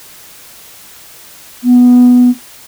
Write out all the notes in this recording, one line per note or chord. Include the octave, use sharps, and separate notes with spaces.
B3